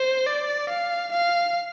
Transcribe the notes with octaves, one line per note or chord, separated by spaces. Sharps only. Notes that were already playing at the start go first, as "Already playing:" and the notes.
Already playing: C5
D5
F5
F5